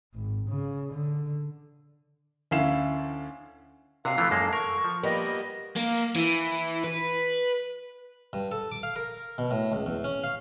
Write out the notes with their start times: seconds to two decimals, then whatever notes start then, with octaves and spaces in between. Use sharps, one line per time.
0.15 G#1
0.48 C#3
0.93 D3
2.51 D2 C#4 E4 F5 C7 E7
4.05 D2 C3 F3 F5 F#5
4.18 E3 F3 A3 F4
4.31 F#2 G#3 A#3 A4
4.53 A#4 C#6
4.84 F3
5.03 G3 A#3 B3 D#5
5.77 A#3
6.16 E3
6.84 B4
8.33 G2
8.52 A4
8.72 D6
8.83 F5
8.96 A#4
9.38 B2
9.51 A2
9.72 C#2
9.86 E2
10.04 C#4
10.24 F5